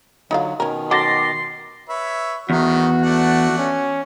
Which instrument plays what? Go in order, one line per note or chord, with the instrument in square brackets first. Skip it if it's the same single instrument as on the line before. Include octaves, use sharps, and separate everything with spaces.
[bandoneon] D3 F#3 [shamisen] D#4 F4 F5
[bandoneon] B2 D#3 [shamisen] C#4 A#4
[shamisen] F#3 C#4 A4 [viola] C6 [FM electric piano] D6 A6 A#6
[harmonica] B4 C#5 E5
[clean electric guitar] E2 [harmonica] D#3 A3 [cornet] F#4
[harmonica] A3 D4 F#5
[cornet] C#4